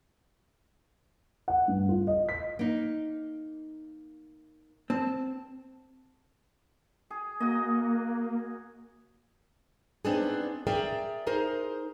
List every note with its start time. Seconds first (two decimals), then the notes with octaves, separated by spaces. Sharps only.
1.48 F#5
1.68 G2
1.89 F4
2.07 D#5
2.29 B6
2.59 A#3 D#4
4.90 C4 A5
7.10 G#4
7.40 A#3 F#4 D#5
10.05 B3 C4 D4 D#4 G#4
10.67 G#4 A#4 D5 E5 G5 A#5
11.27 D#4 G#4 A#4 C5